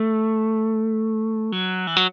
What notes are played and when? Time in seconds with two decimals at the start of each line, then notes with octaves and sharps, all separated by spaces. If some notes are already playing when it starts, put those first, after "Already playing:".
Already playing: A3
1.52 F#3
1.87 E3
1.97 F#3